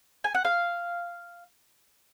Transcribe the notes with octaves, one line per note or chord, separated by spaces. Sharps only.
G#5
F#5
F5